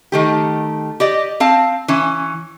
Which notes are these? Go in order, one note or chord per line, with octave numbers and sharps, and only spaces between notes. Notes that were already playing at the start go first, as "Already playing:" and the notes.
D#3 A3 G4
G4 D5 D#5
C4 F5 A5
E3 C#4